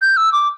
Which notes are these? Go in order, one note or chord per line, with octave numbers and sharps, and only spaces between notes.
G6
E6
D6